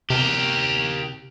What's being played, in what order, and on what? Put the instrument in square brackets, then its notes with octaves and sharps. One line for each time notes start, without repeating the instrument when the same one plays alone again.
[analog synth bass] C3 [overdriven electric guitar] G4 A#4